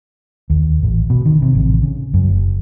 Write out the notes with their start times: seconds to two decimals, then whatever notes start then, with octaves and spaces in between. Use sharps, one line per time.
0.50 D#2
0.83 A1
1.10 B2
1.25 D#3
1.42 C3
1.55 A1
1.82 C#3
2.14 F#2
2.29 F#1